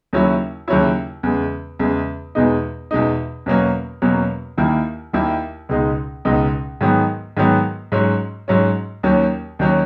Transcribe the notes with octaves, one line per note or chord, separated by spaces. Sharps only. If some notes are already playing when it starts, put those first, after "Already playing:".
D#2 C#3 F#3 C#4 E4
D#2 C#3 F#3 C#4 E4
E2 C#3 G#3
E2 C#3 G#3
E2 B2 G#3 D#4
E2 B2 G#3 D#4
E2 B2 F#3 A#3 C#4
E2 B2 F#3 A#3 C#4
D#2 D#3 A#3 E4
D#2 D#3 A#3 E4
C#2 B2 G#3 D#4
C#2 B2 G#3 D#4
G#2 D#3 F#3 B3
G#2 D#3 F#3 B3
G#2 F#3 C#4
G#2 F#3 C#4
D#2 D#3 F#3 C#4
D#2 D#3 F#3 C#4